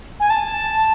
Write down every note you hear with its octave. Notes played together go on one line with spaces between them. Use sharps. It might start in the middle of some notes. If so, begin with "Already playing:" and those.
G#5
A5